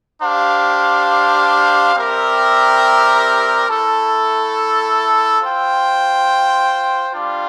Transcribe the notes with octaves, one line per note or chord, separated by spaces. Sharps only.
D4 G4 C5 F5
G3 C4 G4 A#4 E5
A3 E4 A4
F4 C5 G5
G3 D4 F4